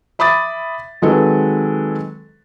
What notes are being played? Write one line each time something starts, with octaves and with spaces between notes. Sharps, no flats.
E5 B5 D6 D#6 A6
D#3 F#3 G#3 C4 A4 B4